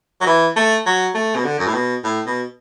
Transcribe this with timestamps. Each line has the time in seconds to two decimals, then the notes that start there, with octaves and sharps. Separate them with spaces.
0.22 F#3
0.27 E3
0.56 A3
0.86 F#3
1.15 A3
1.36 B2
1.45 D3
1.59 F#2
1.67 A2
1.74 B2
2.04 A2
2.27 B2